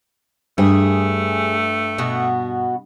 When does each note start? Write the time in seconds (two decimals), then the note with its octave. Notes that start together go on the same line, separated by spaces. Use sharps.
0.58 G2 A3 G#4
1.98 B2 B3 F#4